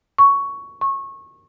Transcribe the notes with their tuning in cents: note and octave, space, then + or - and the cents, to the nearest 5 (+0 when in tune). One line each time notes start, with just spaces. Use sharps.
C#6 +10
C#6 -20